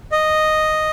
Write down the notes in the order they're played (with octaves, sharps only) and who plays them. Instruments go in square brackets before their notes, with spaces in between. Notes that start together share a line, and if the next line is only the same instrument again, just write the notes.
[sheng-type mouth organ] D#5